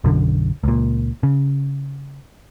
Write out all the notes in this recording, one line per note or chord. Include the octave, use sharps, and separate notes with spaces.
B1 F#2 D3
C#2 A#2
C#3